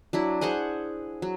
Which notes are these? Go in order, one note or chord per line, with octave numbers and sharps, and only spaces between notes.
F#3 D4 E4
G#4 C5 F#5 G#5
F#3